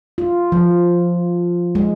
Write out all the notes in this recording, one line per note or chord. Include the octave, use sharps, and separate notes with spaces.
F4
F3
G#3